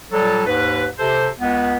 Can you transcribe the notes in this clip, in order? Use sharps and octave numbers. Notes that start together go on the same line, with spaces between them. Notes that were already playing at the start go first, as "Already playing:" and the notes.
A#2 F#3 G3 A4
D#2 G#2 B4
C3 A4 C5
C#2 B3